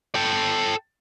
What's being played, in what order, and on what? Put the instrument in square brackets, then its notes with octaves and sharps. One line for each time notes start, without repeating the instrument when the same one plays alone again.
[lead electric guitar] A4 G5